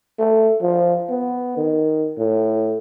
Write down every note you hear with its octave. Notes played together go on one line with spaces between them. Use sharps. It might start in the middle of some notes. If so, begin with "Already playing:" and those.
A3
F3
B3
D#3
A2